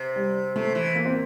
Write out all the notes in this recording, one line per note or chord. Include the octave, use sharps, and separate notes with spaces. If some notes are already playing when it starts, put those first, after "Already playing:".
Already playing: C3
G3
C3 A3
E3
A#3
C4